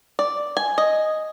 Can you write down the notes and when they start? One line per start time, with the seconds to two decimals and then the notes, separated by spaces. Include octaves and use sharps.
0.19 D5
0.57 G#5
0.78 D#5